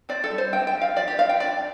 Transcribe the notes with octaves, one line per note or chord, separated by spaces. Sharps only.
C4 D5
A4
G3
C5
C4 G5
G5
F3
F5
F3 D5
G4
C4 F5
G5
D4 D5